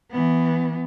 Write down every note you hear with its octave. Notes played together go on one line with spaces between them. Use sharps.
E3 B3